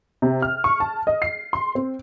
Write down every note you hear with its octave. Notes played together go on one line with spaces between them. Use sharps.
C3
F6
C#6
A5
D#5
C7
C6
C4